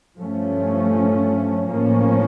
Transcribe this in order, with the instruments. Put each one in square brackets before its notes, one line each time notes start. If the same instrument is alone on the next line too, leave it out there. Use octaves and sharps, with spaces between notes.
[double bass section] G2 F3 A3 C#4
A1 A2 F3 A#3 C#4